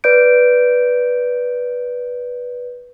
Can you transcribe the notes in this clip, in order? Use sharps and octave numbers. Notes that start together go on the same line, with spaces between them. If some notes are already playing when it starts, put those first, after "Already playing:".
B4 D5 G6 D7